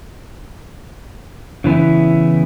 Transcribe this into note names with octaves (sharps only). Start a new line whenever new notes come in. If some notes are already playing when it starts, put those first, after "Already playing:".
C#3 E3 B3 E4